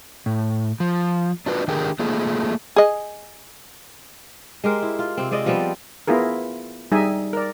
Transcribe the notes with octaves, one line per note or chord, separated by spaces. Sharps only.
A2
F3
D4 F4 F#4 B4
D#3 D4 G4 G#4 A#4
A3 A#3 F4 G#4
G#4 D#5
G#3 G4 A#4 C5
E4
F4
C3 C4
G#3 C4 D5 D#5
F3 G3 B3 C4
B3 E4 F4 G#4 A#4
G3 D#4 G#4 D#5 E5 G#5
A#4 D5